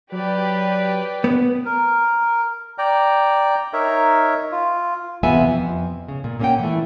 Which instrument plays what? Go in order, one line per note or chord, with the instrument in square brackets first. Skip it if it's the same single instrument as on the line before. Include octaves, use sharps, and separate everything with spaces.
[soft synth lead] F#3 [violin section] G4 B4 D5
[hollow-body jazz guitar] B3
[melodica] A#4
[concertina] D5 G5 A#5
D#4 A#4 C#5 E5
F4
[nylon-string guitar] E2 C3 B3 F4 E5 G#5
F2
C#3
A#2
A#2 A#3 C#4 G#4 F#5 G5
E3 A3